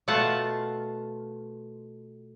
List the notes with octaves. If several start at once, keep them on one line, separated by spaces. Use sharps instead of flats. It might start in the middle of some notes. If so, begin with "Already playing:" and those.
B2 A3 F4 F#5 A5